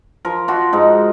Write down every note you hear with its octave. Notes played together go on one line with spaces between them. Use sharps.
F3 A#4
F3 F#4
G#2 D#4